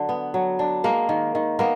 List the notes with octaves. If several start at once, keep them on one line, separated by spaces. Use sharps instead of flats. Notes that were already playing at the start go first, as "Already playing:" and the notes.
Already playing: D3 F#3 D4
B3
F#3
D4
G#3 A#3 A#4
D#3
D#3
A#3 B3 A#4